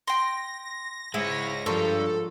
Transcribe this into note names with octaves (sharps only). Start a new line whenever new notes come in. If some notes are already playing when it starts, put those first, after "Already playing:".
G5 C6 A#6
G#2 G#3 E4 C#5 D#6
G2 F3 G3 A4 A#4 C#5 C6